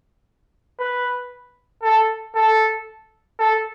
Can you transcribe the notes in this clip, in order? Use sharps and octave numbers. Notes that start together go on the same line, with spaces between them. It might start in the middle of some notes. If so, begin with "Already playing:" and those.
B4
A4
A4
A4